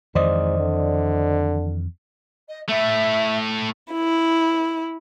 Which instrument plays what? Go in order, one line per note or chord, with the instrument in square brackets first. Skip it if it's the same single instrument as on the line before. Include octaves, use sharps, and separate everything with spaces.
[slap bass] F2 D#3 E3 [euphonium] G#2 [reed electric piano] C5 D5 D#5
[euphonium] D3
[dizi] D#5
[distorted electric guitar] A2 A3 [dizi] E5
[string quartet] E4